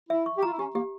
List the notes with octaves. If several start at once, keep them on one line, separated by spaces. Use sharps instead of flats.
E4 E5
C#6
G4
F4 A#5
E4
C#4 G4
A#3 G4